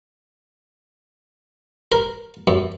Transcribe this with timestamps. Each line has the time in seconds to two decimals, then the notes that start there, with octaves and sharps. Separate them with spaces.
1.92 A#4
2.47 F#2